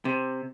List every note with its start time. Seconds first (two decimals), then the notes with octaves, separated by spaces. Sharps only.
0.05 C3